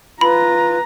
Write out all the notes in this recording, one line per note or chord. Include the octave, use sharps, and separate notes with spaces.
F4 B4 A#5 B5